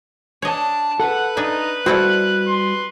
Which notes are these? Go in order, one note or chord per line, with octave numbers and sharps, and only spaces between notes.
D4 C#5 D#5 A5
A4 B4 F#5
D4 D#4 E5 G#5
G3 C4 E4 F#4 A4 F#6
C6